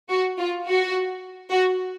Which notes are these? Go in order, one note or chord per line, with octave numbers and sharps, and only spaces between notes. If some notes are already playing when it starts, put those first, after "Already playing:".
F#4
F4
F#4
F#4